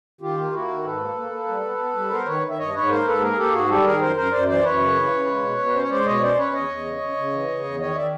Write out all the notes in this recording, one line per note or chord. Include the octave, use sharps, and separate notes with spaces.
D#3 F4 G4
A#3
A#3 E4 F#4
D#3
G#2 A4 B4
A#3
A#3
A#3
G3
B3
B3
G3
B3 A#4 C5
D#3 B4 C#5
D#3
E5
G2 C#5 D#5
G#2 B4 C#5
A#3 A#4 C5
G#2 A4 B4
A#3 G#4 A#4
G#4
A#3 G4 A4
G#2 F#4 G#4
G3 G4 A4
D#3 G#4 A#4
F#2 A#4 C5
F#2 A#4 C5
F#2 C5 D5
E3 C5 D5
F#2 B4 C#5
C#3
E3
C#3
G#3
B2
B2
B4
C#4 C5
C#5
G#3 C5 D5
B2 C#5 D#5
C#4 C5 D5
C#4 B4 C#5
E2 C#5 D#5
E2
C#3
C#3
C#3
E3
C#3
E2
D#3 C#5 D#5
D#3 D5 E5